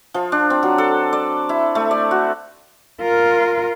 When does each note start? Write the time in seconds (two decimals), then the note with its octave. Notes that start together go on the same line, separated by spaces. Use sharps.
0.14 F3
0.32 D4
0.50 C4
0.63 F#3
0.78 A4
1.13 D5
1.49 E4
1.75 A3
1.91 D5
2.11 F#4
3.01 F4 A#4